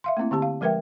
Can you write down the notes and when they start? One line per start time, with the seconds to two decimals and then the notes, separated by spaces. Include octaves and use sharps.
0.04 E5 F5 C6
0.17 A3 A#3 C4 E4
0.31 D3 C4 G4 A5
0.42 F5
0.61 F3 G#3 A#4 B4 E5 G5